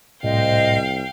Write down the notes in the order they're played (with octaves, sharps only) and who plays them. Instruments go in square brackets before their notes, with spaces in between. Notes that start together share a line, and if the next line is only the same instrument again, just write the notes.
[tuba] C2 [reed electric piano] A2 [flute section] C5 D#5 [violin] F5 G5